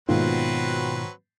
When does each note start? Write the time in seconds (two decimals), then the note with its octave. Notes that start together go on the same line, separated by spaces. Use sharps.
0.09 G#2 B2 D#3 F#3 A#3 C4 F4 B4